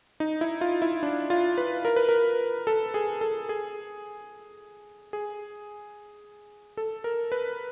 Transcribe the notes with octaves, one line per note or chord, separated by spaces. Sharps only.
D#4
E4
F4
E4
D4
F4
B4
A#4
B4
A#4
A4
G#4
A4
G#4
G#4
A4
A#4
B4